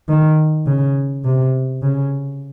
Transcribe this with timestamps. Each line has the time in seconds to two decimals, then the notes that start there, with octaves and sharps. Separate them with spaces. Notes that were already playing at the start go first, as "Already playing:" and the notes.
0.09 D#3
0.67 C#3
1.25 C3
1.83 C#3